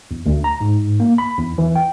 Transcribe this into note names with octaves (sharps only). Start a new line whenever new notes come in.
E2
D2
A#5
G#2
A#3
B5
E2
E3
G5